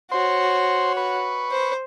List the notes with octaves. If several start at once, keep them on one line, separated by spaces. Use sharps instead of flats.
F#4 C5 C#5 C6
B4 C#6
C5